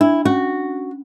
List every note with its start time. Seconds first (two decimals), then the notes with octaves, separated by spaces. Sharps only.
0.01 D4 E4
0.25 C#4 F#4